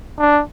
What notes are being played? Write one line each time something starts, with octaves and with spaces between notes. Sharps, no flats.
D4